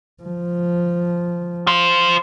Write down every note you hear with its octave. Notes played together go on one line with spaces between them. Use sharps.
F3
F4 C5